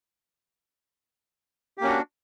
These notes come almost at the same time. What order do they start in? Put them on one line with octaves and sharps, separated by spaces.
G4 A#3 C#4 F#4 D4